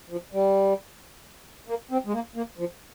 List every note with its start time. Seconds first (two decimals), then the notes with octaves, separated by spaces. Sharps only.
0.10 F3
0.33 G3
1.68 A#3
1.91 C4
2.06 G#3
2.13 A#3
2.36 A#3
2.58 F3